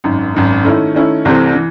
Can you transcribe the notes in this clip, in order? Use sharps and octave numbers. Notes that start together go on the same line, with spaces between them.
G#1 F#2 D#3
G#1 F#2 D#3
D#3 A3 C#4 E4
D#3 A3 C#4 E4
C2 C3 E3 A3 C4
E3